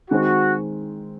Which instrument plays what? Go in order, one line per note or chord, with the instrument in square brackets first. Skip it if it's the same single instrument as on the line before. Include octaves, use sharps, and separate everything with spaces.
[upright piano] D#3 G#3 C4 [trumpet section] F#4